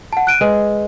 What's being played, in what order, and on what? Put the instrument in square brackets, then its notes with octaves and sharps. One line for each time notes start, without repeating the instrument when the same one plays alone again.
[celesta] F#5 A5
F#6 D7 D#7
[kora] G#3 [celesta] B4